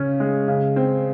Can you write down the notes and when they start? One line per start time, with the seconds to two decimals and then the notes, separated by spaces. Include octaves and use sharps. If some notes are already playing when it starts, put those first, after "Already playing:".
Already playing: C#3 C#4
0.20 G#3
0.48 C#3
0.76 C4